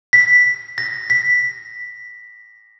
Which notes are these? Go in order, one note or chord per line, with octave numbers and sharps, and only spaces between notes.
B6
A#6
B6